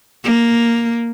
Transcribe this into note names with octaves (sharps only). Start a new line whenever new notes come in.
A#3